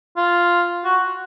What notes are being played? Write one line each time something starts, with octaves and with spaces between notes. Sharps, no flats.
F4
F#4